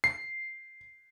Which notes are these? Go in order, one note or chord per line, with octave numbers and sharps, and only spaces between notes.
C7